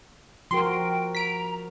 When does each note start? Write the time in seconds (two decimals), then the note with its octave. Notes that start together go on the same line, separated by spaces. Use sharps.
0.51 F3 F#4 A#4 G5 C6
1.15 A#5 B6 D7